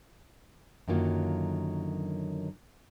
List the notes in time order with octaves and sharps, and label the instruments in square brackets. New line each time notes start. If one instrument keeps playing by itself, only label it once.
[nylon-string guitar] F#2 D3 D#3 F#3 A#3 F4